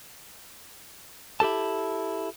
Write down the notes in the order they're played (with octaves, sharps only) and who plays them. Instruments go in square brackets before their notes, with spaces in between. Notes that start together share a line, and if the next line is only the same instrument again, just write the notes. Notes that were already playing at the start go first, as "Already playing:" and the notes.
[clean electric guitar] E4 G4 A4 A5